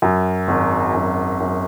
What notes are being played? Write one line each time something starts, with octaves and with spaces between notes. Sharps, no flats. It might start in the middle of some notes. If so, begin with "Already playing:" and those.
F#2
G#1
F#2
F#2